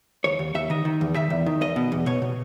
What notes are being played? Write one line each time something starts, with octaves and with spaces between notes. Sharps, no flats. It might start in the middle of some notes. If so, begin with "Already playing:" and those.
D#2 C#5
D#2
D#2 E5
D#3 D#5
D#3
E2
D#3 E5
E2
D#3
E2 D#5
B2
E2
B2 C#5
B2